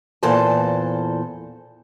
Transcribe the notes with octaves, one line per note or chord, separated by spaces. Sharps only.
E2 A#2 E3 A4 C5 A5